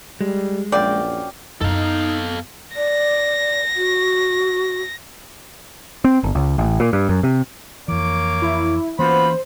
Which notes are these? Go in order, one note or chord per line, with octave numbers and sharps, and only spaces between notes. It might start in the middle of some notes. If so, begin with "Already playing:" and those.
G3 G#3
A#1 F#2 D5 F5 G5
F#2 B3 D#4 A4 F5
D5 A#6
F#4
C4
G1
C#2
A1
A#2
G2
F#2
C3
F2 E3 A#3 C#5 D6
E4
E3 A#3 B3 C#4 F4 F#4 C5 B5